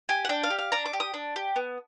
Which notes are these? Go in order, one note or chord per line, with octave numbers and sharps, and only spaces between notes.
G4 G#5
F#5
D4 G5
F5
G4
F5
D4 A#5
D6
G4
D#6
D4
G4
B3